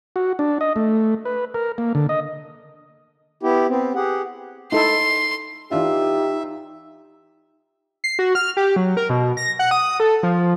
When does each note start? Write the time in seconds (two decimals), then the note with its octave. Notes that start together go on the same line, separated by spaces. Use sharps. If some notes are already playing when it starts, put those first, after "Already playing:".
0.16 F#4
0.39 D4
0.61 D#5
0.76 A3
1.25 B4
1.54 A#4
1.78 A#3
1.95 D3
2.09 D#5
3.43 B3 E4 G4
3.69 B3 C4
3.96 G4 G#4 F#5
4.72 D#4 E4 A4 C6
5.71 E3 D4 D#4 F4 G4 E5
8.04 C7
8.19 F#4
8.35 F6
8.57 G4
8.76 F#3
8.97 A#4
9.10 B2
9.37 A#6
9.59 F#5
9.71 D#6
10.00 A4
10.23 F3